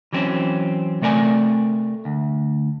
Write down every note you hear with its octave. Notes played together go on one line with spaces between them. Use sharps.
E3 F#3 C4 C#4
C3 A3 A#4 D5 G#5
D2